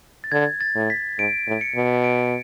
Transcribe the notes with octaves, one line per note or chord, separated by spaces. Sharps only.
A6
D3 G#6
A6
A2
B6
G#2 D7
A2
C#7
B2
D7